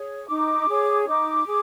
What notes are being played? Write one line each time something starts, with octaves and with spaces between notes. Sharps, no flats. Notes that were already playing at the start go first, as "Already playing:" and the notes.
Already playing: G#4 C#5
D#4 D6
G#4 C#5
D#4 D6
G#4